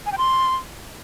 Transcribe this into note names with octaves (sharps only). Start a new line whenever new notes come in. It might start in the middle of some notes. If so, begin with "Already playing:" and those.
G#5
G5
C6